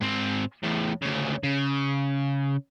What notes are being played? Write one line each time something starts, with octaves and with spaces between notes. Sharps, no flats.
G#2 C4
E2 A2
D2 C#3
C#3